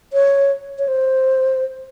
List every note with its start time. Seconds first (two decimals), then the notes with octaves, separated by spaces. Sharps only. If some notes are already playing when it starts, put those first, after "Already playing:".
0.13 C#5
0.79 C#5
0.88 C5